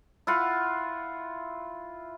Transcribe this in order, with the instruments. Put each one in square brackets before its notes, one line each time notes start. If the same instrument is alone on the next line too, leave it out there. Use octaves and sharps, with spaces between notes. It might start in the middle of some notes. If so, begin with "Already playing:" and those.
[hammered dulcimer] E4 F4 F#5